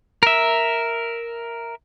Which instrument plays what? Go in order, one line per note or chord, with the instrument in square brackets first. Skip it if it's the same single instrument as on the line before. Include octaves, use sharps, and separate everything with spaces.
[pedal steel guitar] A#4 E5